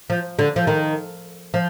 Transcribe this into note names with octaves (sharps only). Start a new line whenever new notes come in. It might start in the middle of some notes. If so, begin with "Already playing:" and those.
F3
D3
F3
D#3
F3